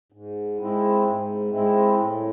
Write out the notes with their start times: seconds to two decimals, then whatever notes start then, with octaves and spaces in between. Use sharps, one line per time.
0.12 G#2
0.58 G#3 C4 E4
1.04 G#2
1.49 G#3 C4 E4
1.94 A2